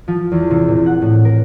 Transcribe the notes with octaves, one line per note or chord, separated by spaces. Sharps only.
F3
E2
C3
A#2
F#5
A2
A#4